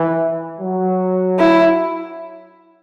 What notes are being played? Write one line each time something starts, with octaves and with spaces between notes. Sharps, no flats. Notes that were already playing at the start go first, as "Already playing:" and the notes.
Already playing: E3
F#3
E4